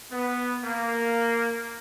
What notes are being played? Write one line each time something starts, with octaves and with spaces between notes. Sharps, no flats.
B3
A#3